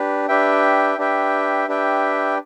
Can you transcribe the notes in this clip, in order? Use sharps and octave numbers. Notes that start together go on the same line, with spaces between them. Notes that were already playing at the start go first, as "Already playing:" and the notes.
Already playing: D4 G4 B4
D4 G4 B4 E5 G5
D4 G4 B4 E5 G5
D4 G4 B4 E5 G5